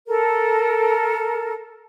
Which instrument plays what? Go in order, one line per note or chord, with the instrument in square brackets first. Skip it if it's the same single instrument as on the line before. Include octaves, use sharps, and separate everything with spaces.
[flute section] A4 A#4